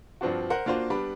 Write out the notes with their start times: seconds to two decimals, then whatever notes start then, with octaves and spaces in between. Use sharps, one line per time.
0.21 G2 F3 C4 D4 F#4
0.50 A#4 C5 F#5
0.66 A#3 D4 F4 F#4 C5
0.90 G3 B3 D4 B5